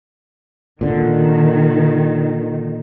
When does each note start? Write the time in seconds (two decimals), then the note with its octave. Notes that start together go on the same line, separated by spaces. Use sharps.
0.81 A#2 D3 D#3